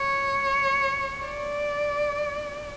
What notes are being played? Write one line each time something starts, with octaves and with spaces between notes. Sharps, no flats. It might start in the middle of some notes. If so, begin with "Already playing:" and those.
Already playing: C#5
D5